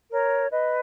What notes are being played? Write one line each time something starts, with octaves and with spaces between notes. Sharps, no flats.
A#4 C#5
B4 D#5